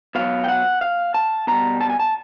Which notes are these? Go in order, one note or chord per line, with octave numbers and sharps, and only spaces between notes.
B2 F#3 F5
G5
F#5
F5
A5
B2 G3 A#5
A5
G#5
A5